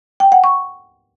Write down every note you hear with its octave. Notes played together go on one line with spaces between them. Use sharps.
G5
F#5
C#6